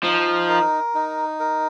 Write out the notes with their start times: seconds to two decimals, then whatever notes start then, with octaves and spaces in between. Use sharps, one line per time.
0.04 F3 D#4
0.49 A#4
0.95 D#4
1.40 A#4